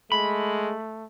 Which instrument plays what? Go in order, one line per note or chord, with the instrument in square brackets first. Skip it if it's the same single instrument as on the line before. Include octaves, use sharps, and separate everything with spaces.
[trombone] G#3 [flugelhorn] A3 [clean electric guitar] B5